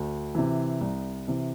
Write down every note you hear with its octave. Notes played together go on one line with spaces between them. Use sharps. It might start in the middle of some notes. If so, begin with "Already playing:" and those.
Already playing: D2
C3 E3
C2
C3 E3